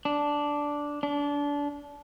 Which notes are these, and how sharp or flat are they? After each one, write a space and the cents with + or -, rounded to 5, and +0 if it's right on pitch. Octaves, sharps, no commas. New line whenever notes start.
D4 -5
D4 -25